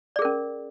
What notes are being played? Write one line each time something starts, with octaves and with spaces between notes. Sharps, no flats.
C#4 G#4 A#4 D5